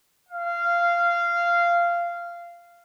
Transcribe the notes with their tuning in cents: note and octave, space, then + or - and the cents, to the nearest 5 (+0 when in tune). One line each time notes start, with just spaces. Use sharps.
F5 -15